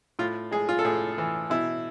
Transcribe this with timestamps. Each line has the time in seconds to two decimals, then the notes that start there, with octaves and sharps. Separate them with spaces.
0.19 A2 F4
0.51 G#3 G#4
0.69 F4
0.79 A4
0.85 A2 G#4
1.18 E3
1.50 B2 E4